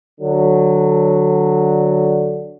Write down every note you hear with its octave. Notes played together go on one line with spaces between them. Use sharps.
D3 F#3